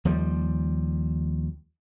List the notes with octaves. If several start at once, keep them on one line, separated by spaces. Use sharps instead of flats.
D#2 F3 G3